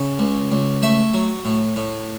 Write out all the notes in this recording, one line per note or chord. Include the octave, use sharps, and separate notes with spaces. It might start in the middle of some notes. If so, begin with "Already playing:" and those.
Already playing: C#3
C#2
C#2
A3 E5
F#3
A2
A2